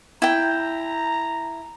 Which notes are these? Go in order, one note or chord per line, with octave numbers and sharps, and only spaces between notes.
E4 G5 A#5